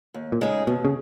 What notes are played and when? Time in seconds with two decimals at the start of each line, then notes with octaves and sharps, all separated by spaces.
0.14 D#2
0.32 A#2
0.41 C#3 G#3 D#4 G#4
0.67 D#2 B2
0.85 C#3